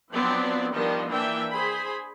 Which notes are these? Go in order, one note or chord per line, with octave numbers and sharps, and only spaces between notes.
F3 F#3 B3 C4 D4 D5
D#3 F3 G3 B3 D4 D#5
E3 A#3 D4 E5 G5
G#4 C5 B5